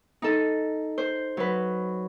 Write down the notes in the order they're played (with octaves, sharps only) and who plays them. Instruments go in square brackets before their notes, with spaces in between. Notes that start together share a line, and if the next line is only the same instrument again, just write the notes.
[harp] D#4 A4
C5
F#3 B4